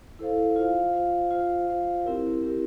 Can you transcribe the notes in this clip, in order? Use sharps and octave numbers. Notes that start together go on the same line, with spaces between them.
E4 A4 C5 F5
F4 C5 F5
F4 C5 F5
F4 C5 F5
F4 C5 F5
C4 E4 G4 A#4
C4 E4 G4 A#4